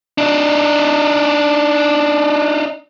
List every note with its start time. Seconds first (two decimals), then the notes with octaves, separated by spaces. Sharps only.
0.18 D4 D#4